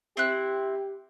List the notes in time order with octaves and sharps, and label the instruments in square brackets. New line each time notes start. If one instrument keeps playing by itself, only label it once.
[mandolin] C4 E4 F#6 [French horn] G4